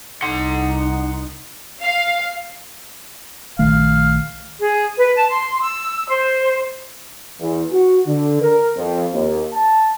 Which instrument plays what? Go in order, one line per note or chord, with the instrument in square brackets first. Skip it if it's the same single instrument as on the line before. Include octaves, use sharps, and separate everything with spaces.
[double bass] C2 D#4 [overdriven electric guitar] F#5 C6
[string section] F5
[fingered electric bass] A#1 D#3 A3 [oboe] F5
[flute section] G#4
B4
A5
C6
E6
C5
[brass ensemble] E2
F#4
D3
A#4
F2
D#2
A5